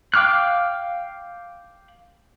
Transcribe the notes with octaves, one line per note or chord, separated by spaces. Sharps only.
F5 G5 D6 F6 F#6